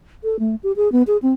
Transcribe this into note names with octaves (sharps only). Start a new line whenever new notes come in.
A4
A3
G4
G#4
B3
G#4
C4